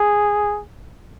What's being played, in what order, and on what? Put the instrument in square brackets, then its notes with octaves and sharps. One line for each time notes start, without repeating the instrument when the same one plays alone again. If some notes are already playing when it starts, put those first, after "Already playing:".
Already playing: [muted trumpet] G#4